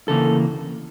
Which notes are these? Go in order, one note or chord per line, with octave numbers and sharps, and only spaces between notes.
D2 C#3 E3 A#3 A4